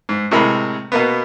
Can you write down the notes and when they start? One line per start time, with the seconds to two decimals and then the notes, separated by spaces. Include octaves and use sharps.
0.09 G#2
0.31 A2 C3 G#3 A#4 B5
0.92 B2 A#3 B3